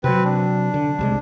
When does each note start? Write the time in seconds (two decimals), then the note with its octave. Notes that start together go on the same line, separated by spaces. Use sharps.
0.04 C3 F#3 C4 B4
0.25 D4
0.74 D3
0.99 C2 C3 G#3